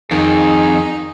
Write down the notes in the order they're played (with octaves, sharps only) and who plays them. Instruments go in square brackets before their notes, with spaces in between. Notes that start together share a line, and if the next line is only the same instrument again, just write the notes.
[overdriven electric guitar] F2 [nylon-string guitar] D#3 [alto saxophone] D#4 [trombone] G#4